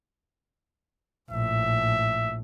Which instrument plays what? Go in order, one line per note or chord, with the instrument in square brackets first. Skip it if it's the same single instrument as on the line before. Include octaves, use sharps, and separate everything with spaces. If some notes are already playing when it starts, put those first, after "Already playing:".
[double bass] A#1 A2 [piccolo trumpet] E5